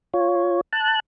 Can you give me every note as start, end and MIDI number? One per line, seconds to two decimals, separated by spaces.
0.14 0.61 65
0.14 0.61 73
0.73 1.00 81
0.73 1.00 90